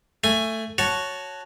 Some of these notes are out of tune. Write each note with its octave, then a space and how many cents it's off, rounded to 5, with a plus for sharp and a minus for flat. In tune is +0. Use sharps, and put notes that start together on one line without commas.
A3 +15 G#5 +0
F#4 +0 C#5 +0 A5 -5